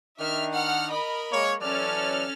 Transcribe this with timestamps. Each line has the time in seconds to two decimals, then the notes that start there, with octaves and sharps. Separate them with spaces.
0.20 D#3 D4 E5 F6
0.53 F#5 F6
0.90 A#4 D#5 B5
1.32 G#3 A#3 C#5
1.62 E3 F#3 C#4 A4 D5 F6